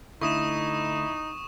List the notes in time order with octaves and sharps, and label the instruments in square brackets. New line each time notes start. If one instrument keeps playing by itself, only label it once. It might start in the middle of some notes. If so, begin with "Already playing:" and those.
[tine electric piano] D3 A3 [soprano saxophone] D#4 [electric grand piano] E4 [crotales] C#6 D#6 E7